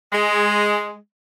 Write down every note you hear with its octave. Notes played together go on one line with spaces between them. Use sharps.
G#3